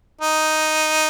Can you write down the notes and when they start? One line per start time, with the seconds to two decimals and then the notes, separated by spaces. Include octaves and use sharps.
0.21 D#4